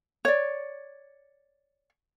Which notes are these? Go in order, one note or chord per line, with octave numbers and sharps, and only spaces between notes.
C#5 D5